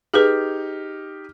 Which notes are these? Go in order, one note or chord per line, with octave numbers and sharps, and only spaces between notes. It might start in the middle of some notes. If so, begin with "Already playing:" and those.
D#4 G4 G#4 B4 F6